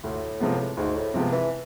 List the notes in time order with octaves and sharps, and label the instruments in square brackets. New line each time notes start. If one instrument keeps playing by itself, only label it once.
[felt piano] D2 [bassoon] A2
[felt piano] C3 F3 G#3 B3
[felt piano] D2 [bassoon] G#2
[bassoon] A2
[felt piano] C3 F3 G#3 B3
[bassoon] E3